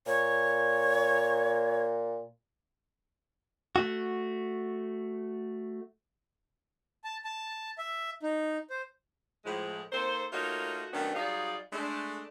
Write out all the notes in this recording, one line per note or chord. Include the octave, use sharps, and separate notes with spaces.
A#2 C#5
A3 F#4
A5
A5
E5
D#4
C5
A2 F3 G#3
A#3 D#4 A4 C5
A3 A#3 D#4 F4 F#4 C#5
D#3 F#3 A3 B3 C#4 D4
F#3 G3 D#4 G#4 D5 F5
G#3 A3 D4